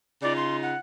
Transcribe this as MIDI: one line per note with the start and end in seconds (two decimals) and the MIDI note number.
0.22 0.75 49
0.22 0.75 63
0.22 0.75 65
0.22 0.33 74
0.36 0.56 84
0.62 0.79 78